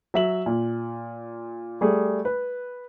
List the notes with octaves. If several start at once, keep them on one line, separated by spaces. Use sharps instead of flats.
F#3 E5 F#7
A#2
G3 A3 G#4
B4